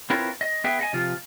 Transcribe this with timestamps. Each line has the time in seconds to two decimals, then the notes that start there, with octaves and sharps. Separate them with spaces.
0.10 C4 E4 F4 A#4 B4 C#5
0.41 D#5
0.64 B3 G#4 B4 E5 G5
0.79 D#5 F#5 G#5
0.93 C3 F3 F4